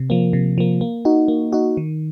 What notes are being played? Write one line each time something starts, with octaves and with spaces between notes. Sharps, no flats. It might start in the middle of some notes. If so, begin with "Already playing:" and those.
Already playing: C3
F3 A#3
C3
F3 A#3
A#3
D#4 F#4
A#3
D#4 F#4
D#3